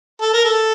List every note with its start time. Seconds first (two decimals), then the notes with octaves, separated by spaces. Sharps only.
0.21 A4
0.33 A#4
0.45 A4